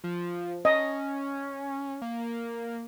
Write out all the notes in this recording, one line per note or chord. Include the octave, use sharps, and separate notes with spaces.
F3
C#4 D#5
A#3